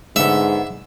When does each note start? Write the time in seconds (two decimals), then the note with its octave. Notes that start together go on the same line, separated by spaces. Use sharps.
0.16 G#2 D3 B3 E5